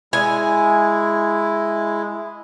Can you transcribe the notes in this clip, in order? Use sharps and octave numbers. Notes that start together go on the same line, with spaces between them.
G#3 E4 G#5